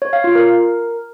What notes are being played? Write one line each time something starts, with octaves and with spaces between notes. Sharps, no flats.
C#5
F5
F4
A#4